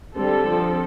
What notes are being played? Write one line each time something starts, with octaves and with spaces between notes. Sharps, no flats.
D3 G3 C4 A4
F3 C4